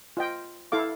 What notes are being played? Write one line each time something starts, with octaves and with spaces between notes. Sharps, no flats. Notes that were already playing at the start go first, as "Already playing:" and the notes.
F4 D#5 G5
E4 A4 F5 D6